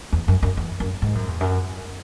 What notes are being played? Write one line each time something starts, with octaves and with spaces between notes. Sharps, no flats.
E2
F#2
F#2
E2
F#2
G#2
F#2
E2
F#2